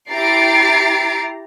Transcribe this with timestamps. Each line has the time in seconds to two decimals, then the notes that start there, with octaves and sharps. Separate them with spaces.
0.11 E4 G4 A#5 A6 C7 D7